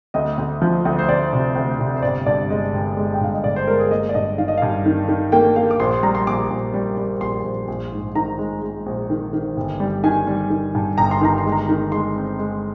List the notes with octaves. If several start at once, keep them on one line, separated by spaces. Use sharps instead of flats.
D2 D#5
D2
F3
D2
C5
D2 D5
C3
D2
C3
C5
G1 D5
G2 D5
G#3 D#5
G1
G#3
G5
G2 F5
D#5
G1 D5
C5
G#3 A#4
G#4
A#3 D#5
D5
G2 D#5
D#3 F5
D#5
G2 F5
D#3
D#3
A#3 G5
A#3 F5
D6
A#1 C6
C6
G3 A#5
C6
A#1 D6
A#1
G3
G3
A#1 C6
A#1
A#1
G#2
D#3 A#5
G#3
G#3
A#1
D#3
D#3
G1
G3
D#3 G#5
G3
D#3
G2
G1 A#5
C6
D#3 A#5
C6
G#3
A#5
D#3
G#3 C6
C4
G#3